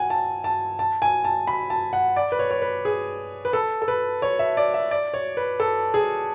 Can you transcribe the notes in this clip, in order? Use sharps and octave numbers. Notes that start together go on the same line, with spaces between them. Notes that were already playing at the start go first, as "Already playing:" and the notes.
Already playing: F#5 G#5
A5
A5
A5
G#5
A5
B5
A5
F#5
D5
B4
C#5
C#5
B4
G#4
B4
A4
A4
B4
C#5
E5
D5
E5
D5
C#5
B4
A4
G#4